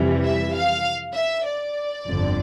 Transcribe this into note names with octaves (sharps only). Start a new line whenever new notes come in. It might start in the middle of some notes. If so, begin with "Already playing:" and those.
Already playing: F2 C3 E3 G3
E5
F5
E5
D5
G1 F2 D3